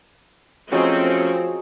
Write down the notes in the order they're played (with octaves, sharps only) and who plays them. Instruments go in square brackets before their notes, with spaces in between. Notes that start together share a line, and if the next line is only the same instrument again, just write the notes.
[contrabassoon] F3 [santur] F#3 G#4 D#5 [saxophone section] A3 C#4 [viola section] C4